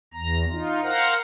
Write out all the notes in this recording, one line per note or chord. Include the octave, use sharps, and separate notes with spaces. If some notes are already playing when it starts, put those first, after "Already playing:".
E2 A#5
D#4 F4
A#4 C5 F5 F#5 A#5